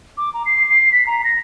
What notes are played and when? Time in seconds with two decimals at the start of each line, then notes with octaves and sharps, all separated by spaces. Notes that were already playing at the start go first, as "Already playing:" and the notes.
0.17 D6
0.34 A#5
0.46 C7
0.70 C7
0.92 B6
1.07 A#5
1.24 A#6